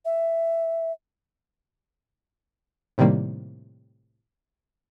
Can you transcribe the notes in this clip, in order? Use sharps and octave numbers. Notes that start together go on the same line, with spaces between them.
E5
A2 C3 D#3 G3 A#3